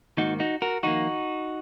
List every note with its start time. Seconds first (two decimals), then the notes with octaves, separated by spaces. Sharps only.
0.17 G#2 D#3 A#3 D#4 F#4
0.40 D#4 F#4
0.62 F#4 A#4
0.83 F2 D#3 A#3 D#4 F#4